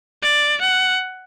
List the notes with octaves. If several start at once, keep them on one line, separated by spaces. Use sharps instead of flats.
D5
F#5